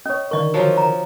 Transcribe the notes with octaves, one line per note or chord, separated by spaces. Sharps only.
C#4 C#5 D#5
D3 D#3 A#4 D5 D#5 C#6
F3 F#3 C#4 F#4 D#5
A#5